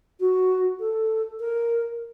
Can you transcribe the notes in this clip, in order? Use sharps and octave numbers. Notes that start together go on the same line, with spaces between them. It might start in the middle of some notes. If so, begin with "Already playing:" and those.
F#4
A4
A#4